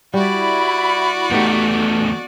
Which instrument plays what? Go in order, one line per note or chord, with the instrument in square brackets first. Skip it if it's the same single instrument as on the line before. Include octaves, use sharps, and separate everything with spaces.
[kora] G3 [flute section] E4 B5 [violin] F#4 D5
[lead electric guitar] E2 A3 [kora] B3 D#4 G4